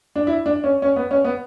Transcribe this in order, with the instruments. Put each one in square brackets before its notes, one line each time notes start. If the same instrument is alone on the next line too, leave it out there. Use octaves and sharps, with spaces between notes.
[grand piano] D4
E4
D4
C#4
C#4
B3
C#4
B3